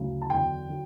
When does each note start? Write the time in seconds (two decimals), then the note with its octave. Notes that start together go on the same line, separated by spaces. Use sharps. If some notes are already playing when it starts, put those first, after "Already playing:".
Already playing: D2 C#3 F#3
0.22 A5
0.30 E2 D3 F#3 G5
0.69 D3 F#3